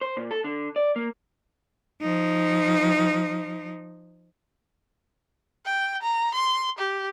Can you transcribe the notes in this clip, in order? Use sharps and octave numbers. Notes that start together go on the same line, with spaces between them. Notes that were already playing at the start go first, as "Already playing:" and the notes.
C5
A#2
A4
D3
D5
A#3
F3 D#4
G5
A#5
C6
G4